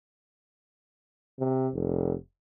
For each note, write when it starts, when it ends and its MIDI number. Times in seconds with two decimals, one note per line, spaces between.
1.39 1.68 48
1.74 2.14 29